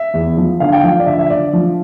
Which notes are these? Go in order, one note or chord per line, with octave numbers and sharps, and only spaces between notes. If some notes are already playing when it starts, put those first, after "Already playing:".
Already playing: E5
E2
F3
D3 F5
G5
F3 F5
D5
D3 E5
E5
D3 D5
F3